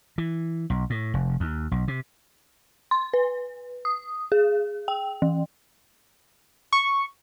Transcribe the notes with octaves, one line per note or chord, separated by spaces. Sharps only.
E3
B1
A2
F1
D#2
B1
C3
C6
B4
D#6
G#4
G5
E3
C#6